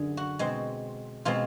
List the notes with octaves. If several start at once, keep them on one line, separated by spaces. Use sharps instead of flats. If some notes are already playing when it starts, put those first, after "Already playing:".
Already playing: F#2 D3 G#4
F#4
B2 G#3 C4
B2 G#3 C4 F4